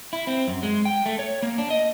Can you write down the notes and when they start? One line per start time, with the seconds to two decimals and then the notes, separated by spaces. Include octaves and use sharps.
0.13 E4
0.27 C4
0.48 F#2
0.63 G#3
0.85 G5
1.06 A3
1.19 C#5
1.43 A#3
1.58 D4
1.70 D#5